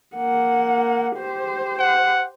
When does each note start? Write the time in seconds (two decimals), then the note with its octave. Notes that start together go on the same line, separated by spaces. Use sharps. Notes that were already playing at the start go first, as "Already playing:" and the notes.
0.17 A#3 F#5
1.17 G4 C5
1.79 F#5